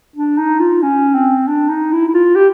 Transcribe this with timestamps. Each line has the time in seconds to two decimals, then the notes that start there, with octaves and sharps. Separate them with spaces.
0.16 D4
0.38 D#4
0.60 F4
0.82 C#4
1.15 C4
1.48 D4
1.69 D#4
1.92 E4
2.08 E4
2.14 F4
2.36 G4